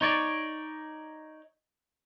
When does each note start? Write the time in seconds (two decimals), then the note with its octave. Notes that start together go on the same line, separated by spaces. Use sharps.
0.01 D#4 C#5 D5